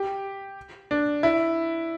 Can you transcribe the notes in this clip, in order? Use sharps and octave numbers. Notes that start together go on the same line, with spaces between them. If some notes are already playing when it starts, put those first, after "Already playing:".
Already playing: G4
D4
E4